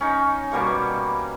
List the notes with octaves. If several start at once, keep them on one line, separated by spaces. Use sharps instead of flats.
C#4 D#4
B2 G3 A#3 C#6